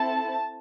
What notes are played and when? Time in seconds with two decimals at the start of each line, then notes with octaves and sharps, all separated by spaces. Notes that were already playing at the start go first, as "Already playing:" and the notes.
Already playing: C4 E4 A4 A5